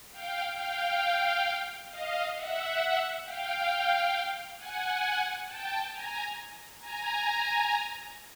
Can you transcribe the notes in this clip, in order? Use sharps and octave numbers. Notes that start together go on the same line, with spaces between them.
F5 G5
F5 G5
D#5 F5
E5 F#5
F5 G5
F#5 G#5
G5 A5
G#5 A#5
G#5 A#5